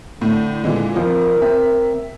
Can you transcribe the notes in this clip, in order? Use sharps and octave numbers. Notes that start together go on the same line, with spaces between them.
A2 D3
A#2 E3 G#3
F2 F3 A#4
C4 E5